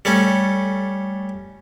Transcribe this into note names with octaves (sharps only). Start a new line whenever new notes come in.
G3 A3 C#4